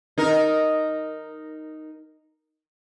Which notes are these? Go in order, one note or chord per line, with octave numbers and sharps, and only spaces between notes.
D#4 A#4